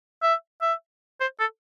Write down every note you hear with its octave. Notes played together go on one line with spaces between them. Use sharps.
E5
E5
C5
A4